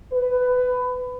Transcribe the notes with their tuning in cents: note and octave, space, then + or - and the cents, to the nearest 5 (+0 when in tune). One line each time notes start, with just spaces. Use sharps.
B4 +20